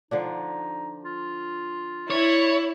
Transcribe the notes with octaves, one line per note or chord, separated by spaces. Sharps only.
D3 F3 D4 D#4
F4
E4 C#5 D5